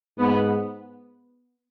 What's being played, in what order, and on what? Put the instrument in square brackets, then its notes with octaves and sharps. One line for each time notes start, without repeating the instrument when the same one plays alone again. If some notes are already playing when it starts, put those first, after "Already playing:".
[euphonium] G#2 [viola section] B3